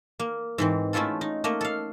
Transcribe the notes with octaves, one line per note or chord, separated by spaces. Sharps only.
A#3
G#2 E3 C4
A3 C#4 E4 F4 A4
D#4
A3 A#3 D#5
A4 F5